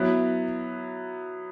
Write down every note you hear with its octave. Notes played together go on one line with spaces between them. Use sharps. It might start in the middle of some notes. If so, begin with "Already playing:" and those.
Already playing: F#3 B3 E4